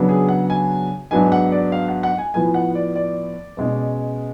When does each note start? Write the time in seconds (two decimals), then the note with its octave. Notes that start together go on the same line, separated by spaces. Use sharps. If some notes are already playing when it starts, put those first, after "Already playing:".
Already playing: C#3 F#3 B3 D4
0.09 G#4
0.29 F#5
0.50 G#5
1.11 G#2 F#3 B3 D4 G#5
1.32 F#5
1.52 D5
1.72 F5
1.89 F#5
2.03 F#5
2.18 G#5
2.34 A2 F3 B3 G#5
2.54 F#5
2.75 D5
2.95 D5
3.57 B2 G#3 C#4